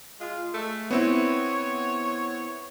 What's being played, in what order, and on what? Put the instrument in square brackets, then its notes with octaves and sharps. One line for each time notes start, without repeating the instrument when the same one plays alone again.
[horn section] G#3 F4
G#3 A3
[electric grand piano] B3 C4 E4 [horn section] C#5